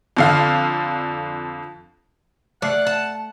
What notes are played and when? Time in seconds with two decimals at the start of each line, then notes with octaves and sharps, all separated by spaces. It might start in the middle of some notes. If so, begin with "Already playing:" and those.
0.17 F2 D3 F5
2.62 A3 D5 F#5 F6 C7
2.87 A5